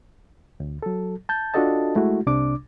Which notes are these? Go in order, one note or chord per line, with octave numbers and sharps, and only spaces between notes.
D2
F#3 A4
A5 G6
D4 F4 F#4 A4 D#5 A5
G#3 A3 E4 F#4
C2 C3 D4 D6